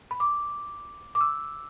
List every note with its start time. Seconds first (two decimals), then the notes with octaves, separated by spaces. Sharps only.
0.11 B5
0.20 D6
1.15 D6
1.21 E6